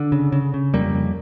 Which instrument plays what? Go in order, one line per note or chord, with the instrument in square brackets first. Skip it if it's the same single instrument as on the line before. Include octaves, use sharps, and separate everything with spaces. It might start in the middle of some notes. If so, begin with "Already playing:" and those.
Already playing: [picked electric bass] D3
C#3
C#3
C#3
F2 G3 A#3
F2